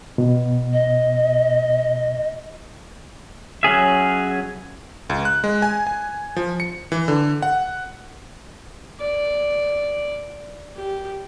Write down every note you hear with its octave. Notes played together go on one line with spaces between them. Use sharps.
B2
D#5
F#3 C#4 G#4 E5
C#2
F#6
G#3
G#5
G#5
F3
C#7
E3
D3
F#5
D5
G4